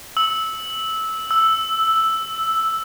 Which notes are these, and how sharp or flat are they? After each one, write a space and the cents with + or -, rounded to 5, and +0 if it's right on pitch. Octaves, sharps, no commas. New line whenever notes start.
E6 -15
E6 +0